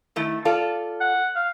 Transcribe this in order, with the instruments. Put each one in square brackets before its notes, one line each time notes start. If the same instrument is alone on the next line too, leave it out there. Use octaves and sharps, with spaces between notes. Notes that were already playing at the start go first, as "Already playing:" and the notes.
[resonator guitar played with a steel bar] D#3 A3 E4
F4 A4 D5
[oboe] F#5
F5